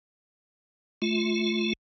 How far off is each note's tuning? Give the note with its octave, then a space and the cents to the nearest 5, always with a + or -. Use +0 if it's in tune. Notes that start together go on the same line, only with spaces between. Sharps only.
A3 -20 F4 +0